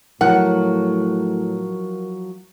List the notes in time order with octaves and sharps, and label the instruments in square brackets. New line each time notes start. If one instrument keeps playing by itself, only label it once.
[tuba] A2 [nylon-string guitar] F3 F#3 E4 [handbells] A#4 [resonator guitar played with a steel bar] F#5